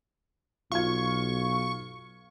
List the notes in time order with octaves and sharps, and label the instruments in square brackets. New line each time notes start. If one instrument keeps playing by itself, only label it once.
[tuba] B1 [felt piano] F4 F5 G#6 [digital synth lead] C#6